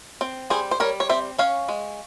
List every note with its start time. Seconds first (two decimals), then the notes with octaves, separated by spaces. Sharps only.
0.21 C4
0.50 G3 G#4 C5
0.71 C5
0.80 G3 A#4 C#5
1.00 C#5
1.09 C4 C5 E5
1.38 C#4 C#5 F5
1.69 G#3